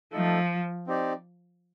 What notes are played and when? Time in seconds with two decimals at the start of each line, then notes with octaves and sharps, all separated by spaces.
0.12 F3 A3 D#4 A4
0.87 C4 D#4 G4 D5